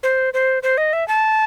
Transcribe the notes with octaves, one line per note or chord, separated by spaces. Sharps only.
C5
C5
C5
D#5
E5
A5